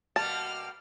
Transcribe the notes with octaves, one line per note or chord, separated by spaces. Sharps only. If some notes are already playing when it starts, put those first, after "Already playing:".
B2 G3 A#3 A5 F6